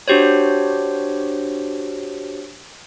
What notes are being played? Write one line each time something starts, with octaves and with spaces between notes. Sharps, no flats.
D4 F#4 G4 C5 C#5